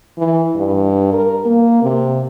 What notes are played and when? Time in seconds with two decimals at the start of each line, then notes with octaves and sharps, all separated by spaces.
0.18 E3
0.56 G2
1.13 A#4
1.46 A#3
1.83 C3